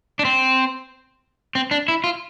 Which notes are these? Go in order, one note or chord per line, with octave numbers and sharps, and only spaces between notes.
D4
C4
C4
D4
E4
F4